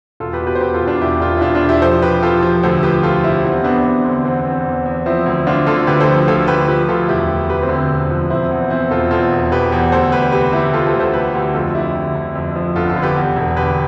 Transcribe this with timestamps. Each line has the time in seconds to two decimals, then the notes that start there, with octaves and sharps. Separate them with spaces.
0.20 E1 F4 A4
0.33 G4 B4
0.40 B2
0.47 G4 B4
0.55 C5
0.60 E1 G4 B4
0.74 F4 A4
0.81 E1
0.87 D4 F4
1.01 E1 E4 G4
1.21 E1 D4 F4
1.37 E4
1.41 E1 D4 F4
1.55 D4 F4
1.61 E1
1.69 E4 G4
1.82 F3 A4 C5
2.02 C3 G4 B4
2.22 F3 F4 A4
2.43 F3
2.63 D2 A4 C5
2.83 F3 G4 B4
3.03 F3 F4 A4
3.24 C3 E4 G4
3.44 E2 C4 E4
3.64 E2 B3 D4
3.85 E2 B3
4.04 D3 C4
4.25 E2 C4
4.38 B3
4.45 E2
4.52 C4
4.66 E2
4.85 E2
5.06 F3 C4 E4
5.26 D2
5.47 D2 D4 F4
5.66 D3 F4 A4
5.87 D2 G4 B4
6.00 A4 C5
6.07 F3
6.27 D2 F4 A4
6.47 D2 G4 B4
6.68 F3 G4 B4
6.88 D2 F4 A4
7.08 E1 E4 G4
7.29 E1
7.49 D2 G4 B4
7.63 C4
7.69 D3
7.76 C4
7.89 E1
8.11 F3
8.30 E1 C4 E4
8.51 E2
8.70 E2 C4 E4
8.91 E1 F4 A4
9.11 E2 F4 A4
9.31 E1
9.52 E1 G4 B4
9.72 E2
9.92 D2 A4 C5
10.12 D2 G4 B4
10.32 C3 G4 B4
10.53 D2 E4 G4
10.73 D2 F4 A4
10.87 A4 C5
10.94 D2
11.00 A4 C5
11.13 C3 G4 B4
11.35 D2
11.54 F2 F4 A4
11.75 D3 E4 G4
11.95 D3
12.15 D3
12.35 F2
12.56 F3
12.76 G1 F4 A4
12.89 F4 A4
12.96 D3
13.02 G4 B4
13.16 E2
13.36 E1
13.56 D3 G4 B4